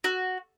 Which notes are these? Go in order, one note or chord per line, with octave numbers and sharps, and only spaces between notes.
F#4